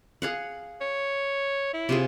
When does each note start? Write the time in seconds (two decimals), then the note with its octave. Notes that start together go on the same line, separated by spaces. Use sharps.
0.22 G#4 F5 F#5
0.81 C#5
1.74 E4
1.89 C3 F4 G#4